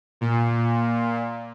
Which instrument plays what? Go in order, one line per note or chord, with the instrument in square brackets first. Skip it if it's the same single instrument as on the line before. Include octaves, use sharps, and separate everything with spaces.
[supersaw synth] A#2